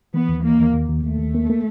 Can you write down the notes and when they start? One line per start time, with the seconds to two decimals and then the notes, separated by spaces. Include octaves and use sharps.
0.14 E3 B3
0.29 D#2
0.43 E3 A#3
0.59 D#2
0.73 D#2
0.89 D#2
1.03 D#2 A3
1.19 D#2
1.35 A#3
1.50 A#3